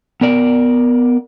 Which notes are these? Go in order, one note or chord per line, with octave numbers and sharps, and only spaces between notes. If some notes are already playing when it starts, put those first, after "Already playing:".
B3 A#4 D5